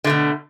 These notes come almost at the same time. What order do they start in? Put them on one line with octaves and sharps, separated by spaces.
D3 A3 B2